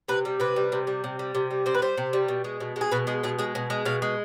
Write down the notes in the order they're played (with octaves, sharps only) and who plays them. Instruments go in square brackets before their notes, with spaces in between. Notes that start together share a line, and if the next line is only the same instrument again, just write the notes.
[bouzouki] C3 B4
G3
C3 B4
G3
C3
G3
C3
G3
C3
G3
C3 C5
B4
G3 C5
C3
G3
B2
G#3
B2
G#3
G#4
B2 B4
G#3 G#4
B2 G#4
G#3 G#4
B2
G#3
B2 F5
G#3